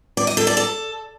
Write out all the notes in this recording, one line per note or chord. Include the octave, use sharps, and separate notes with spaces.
D5
D#5
A4
D5
A4